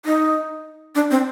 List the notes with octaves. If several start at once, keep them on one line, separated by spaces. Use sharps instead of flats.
D#4
D4
C4